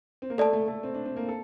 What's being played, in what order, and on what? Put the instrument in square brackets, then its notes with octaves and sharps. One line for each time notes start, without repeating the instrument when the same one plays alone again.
[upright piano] C4
A#3
[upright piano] A3 [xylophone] A4 D5 A5
[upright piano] A3
A3
C4
D4
C4
A#3
A4